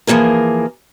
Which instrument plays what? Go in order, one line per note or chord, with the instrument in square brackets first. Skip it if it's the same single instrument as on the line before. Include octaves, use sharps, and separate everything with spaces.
[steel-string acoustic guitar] E3 F3 A#3 G#4 A#4